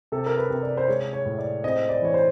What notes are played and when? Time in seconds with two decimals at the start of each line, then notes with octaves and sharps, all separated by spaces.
0.12 C3 A4
0.26 A#4
0.38 B4
0.50 C3
0.63 D5
0.77 C5
0.88 G#3 C#5
1.13 C#5
1.25 A2
1.39 D5
1.64 C4 D#5
1.89 D5
2.02 E3 C#5
2.14 C5